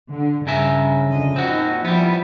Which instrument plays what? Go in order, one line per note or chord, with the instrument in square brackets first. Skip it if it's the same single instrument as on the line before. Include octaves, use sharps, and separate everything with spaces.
[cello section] D3
[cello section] G2 [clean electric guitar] C#3 A#4 E5
[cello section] F2 D3 D#5
[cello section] A#2 D#4 [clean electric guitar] C4 F#4
[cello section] F3 E4 D5 [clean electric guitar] G3 B3